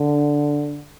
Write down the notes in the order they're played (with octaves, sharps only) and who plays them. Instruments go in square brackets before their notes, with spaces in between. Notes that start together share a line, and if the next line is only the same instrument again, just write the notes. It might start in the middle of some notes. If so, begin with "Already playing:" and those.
Already playing: [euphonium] D3